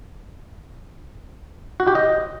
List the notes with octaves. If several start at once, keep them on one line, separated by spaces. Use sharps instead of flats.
F#4
G4
D#5